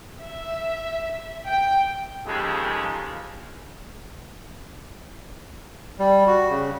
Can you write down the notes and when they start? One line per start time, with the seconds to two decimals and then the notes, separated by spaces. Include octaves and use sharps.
0.21 E5
1.47 G5
2.26 D#2 C#3 F3 G#3 G4 A4
5.99 G3
6.27 F#4
6.50 C#3